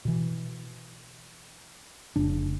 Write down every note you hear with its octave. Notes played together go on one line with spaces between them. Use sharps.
B2 E3
F1 C#3 D4